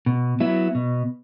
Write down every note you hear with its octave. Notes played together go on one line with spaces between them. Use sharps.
B2
F#3 B3 E4
B2